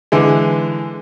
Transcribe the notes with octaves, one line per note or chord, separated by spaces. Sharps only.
D3 E3 G#3